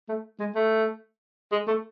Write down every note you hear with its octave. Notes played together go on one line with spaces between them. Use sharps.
A3
G#3
A3
G#3
A3